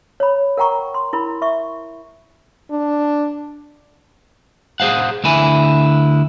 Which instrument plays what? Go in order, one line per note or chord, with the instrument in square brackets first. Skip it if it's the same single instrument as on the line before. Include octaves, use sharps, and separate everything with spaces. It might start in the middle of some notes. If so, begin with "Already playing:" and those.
[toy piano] C#5 B5
A#4 F#5 G5 A#5 C#6
C6
E4 A#4 B5
E5 C#6
[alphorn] D4
[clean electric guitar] G#4 A#4 C5 F5 F#5
D2 D3 E4 G#5